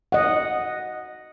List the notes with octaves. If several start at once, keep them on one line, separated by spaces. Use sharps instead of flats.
D#5 F#5